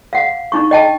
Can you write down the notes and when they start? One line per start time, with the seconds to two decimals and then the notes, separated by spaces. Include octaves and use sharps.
0.13 F5 F#5
0.52 D4 D#4 C#6
0.71 D#5 G5 A5